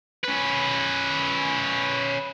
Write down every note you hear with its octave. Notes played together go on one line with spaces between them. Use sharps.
C#4 B4